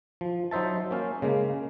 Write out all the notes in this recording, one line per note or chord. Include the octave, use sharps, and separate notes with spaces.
F3
F#3 D#4 C5 E5 A5
A#3 C#4 F5
C#3 G#3 A#3